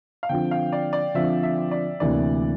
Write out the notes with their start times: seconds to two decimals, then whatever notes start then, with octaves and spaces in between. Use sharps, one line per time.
0.23 F5
0.29 D3 F3 C4 F4 G5
0.51 F5
0.72 D5
0.93 D5
1.14 D3 F3 C4 F4 E5
1.43 E5
1.71 D5
2.00 D2 C3 E3 A#3 D4 D5